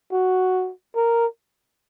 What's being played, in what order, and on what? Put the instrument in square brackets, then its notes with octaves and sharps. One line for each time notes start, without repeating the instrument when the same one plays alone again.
[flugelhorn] F#4
A#4